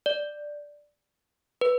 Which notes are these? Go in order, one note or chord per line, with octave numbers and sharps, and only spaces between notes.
D5
B4